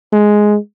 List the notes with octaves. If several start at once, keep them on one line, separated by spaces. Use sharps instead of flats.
G#3